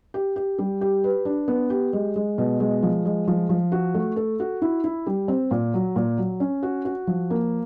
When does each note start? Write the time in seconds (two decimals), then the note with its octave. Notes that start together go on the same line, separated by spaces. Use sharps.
0.14 G4
0.36 G4
0.58 G3
0.81 G4
1.04 B4
1.25 D4
1.48 B3
1.70 G4
1.93 G#3
2.16 G#3
2.38 B2
2.60 G#3
2.83 F3
3.05 G#3
3.27 F3
3.49 F3
3.72 F#4
3.94 A3
4.16 A4
4.40 F#4
4.62 E4
4.84 E4
5.07 G3
5.28 C4
5.51 A#2
5.74 F#3
5.96 A#2
6.18 F#3
6.40 C#4
6.63 F#4
6.85 F#4
7.07 F3
7.30 A#3